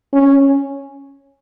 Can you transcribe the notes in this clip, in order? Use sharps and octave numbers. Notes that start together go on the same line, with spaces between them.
C#4